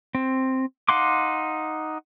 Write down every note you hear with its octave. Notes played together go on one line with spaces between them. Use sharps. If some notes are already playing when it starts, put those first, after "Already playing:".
C4
D#4 F5 F#5 C6 D6